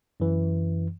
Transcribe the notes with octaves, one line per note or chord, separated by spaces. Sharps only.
F#2 E3